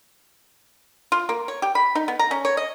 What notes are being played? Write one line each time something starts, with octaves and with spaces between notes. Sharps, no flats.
F4
A#3
C#5
G4
B5
D#4
B3
A#5
C#4
C#5
D#5